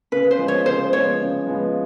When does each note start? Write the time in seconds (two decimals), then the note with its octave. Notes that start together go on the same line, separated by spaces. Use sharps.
0.12 C#3 B4
0.31 C5
0.39 F3 G#3 B3
0.48 C#5
0.66 C#3 C5
0.93 F3 G#3 B3 C#5
1.20 C#3
1.47 F3 G#3 B3